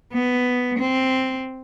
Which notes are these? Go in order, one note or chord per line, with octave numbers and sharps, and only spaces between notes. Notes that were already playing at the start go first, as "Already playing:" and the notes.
B3
C4